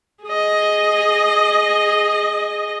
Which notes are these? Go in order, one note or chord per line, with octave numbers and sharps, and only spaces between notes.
G#4 D#5